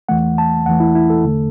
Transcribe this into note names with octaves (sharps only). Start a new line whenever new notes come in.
E2 E3 A3 F#5
A5
E2 E3 A3 F#5
E4
E4
A4
E2 D3 A3